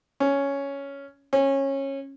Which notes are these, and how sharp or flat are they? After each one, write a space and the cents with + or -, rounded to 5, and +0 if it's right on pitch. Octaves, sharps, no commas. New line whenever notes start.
C#4 +5
C#4 -20